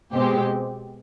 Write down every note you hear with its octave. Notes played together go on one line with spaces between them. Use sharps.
B2 G#3 C4 G4